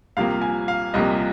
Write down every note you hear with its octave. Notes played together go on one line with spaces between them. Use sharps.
C2 C3 F3 A#3 F5
G#5
F5
C2 C3 F3 A#3 D#5